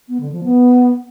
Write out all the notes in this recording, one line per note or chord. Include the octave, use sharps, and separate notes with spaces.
B3
D3
F3
B3